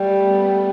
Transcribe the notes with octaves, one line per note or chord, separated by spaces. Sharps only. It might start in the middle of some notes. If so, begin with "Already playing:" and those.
Already playing: G3 A3
B3